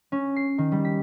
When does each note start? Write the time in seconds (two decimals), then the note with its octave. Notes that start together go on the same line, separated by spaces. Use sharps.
0.12 C#4
0.36 C7
0.58 D#3
0.72 G3
0.85 B6